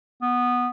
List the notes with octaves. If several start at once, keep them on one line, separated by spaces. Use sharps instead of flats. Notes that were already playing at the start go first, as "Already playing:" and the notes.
B3